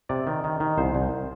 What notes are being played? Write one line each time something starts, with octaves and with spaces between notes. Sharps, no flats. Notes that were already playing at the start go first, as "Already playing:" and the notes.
C3 D5
D#3
D#3
D#3
C2 C5
C2